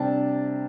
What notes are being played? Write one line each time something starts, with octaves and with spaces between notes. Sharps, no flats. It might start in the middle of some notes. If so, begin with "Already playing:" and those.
Already playing: C3 G3 D4 A5